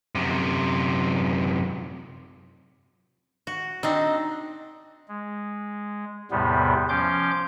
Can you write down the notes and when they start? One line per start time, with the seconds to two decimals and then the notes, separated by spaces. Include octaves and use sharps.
0.15 F#2 C3
3.47 F#4
3.83 C4 D4 D#4
5.08 G#3
6.31 E2 A2 C3 G3 B3
6.89 F3 C#4 C6 D6 G6